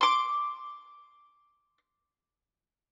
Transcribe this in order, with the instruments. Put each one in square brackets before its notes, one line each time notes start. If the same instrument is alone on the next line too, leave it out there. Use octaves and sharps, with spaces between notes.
[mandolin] C6 D6